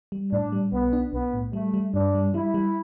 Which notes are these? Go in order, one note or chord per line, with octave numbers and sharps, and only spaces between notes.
G3
A2 D4
G3
B1 B3
D4
B1 B3
A2
G3 A3
G3
G2 D4
G3
G3 E4
G3